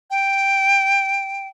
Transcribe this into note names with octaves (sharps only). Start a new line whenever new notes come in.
G5